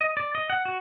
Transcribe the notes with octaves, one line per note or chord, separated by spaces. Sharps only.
D#5
D5
D#5
F#5
F#4